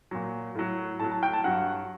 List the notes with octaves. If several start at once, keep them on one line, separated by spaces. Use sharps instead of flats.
A#2 F#3
A2 F#3
A2 F#3 A5
A5
G5
A5
G2 F#3 F#5